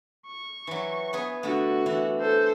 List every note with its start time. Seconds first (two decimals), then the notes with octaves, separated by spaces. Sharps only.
0.26 C#6
0.67 E3 F#3
1.13 B3 G#4 B4
1.43 D3 A3 F#4
1.86 E3 D4 E4
2.19 A4 C5